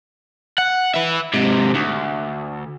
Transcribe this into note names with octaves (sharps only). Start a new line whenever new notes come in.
F#5
B4 E5
G#2 C3
D2